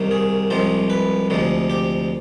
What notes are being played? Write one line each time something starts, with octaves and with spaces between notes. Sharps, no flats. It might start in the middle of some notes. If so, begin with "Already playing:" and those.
Already playing: C2 C3 D#3
G#4
C2 C3 F3 G#3 C5
B4
D2 C3 F3 G#3
G4